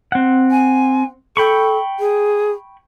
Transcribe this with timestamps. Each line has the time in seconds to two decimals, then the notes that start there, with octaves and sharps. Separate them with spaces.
0.12 C4 F#5
0.51 G#5
1.37 A4 G5 B5 C#6
2.00 G#4